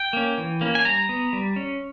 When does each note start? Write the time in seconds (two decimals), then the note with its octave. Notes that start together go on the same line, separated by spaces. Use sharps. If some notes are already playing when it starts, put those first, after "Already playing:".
Already playing: G5
0.13 A#3 C#4
0.38 E3
0.61 A#3 C#4
0.75 G#5
0.85 G3 A#5
1.09 B3
1.33 G3
1.56 C#4